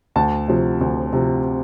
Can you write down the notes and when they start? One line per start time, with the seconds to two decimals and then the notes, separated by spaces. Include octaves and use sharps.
0.16 D2 A5
0.48 C3 F3
0.81 D2
1.13 C3 F3